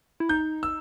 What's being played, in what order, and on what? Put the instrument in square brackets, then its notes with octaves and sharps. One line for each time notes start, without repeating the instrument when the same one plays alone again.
[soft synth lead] E4
[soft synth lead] D#4 [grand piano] G6
[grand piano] E6